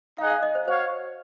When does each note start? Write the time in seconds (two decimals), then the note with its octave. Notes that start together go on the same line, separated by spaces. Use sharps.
0.18 D#4 G#4 D#5 F5 F#5
0.31 F5
0.43 D#5
0.55 C5
0.67 F#4 C5 C#5 F5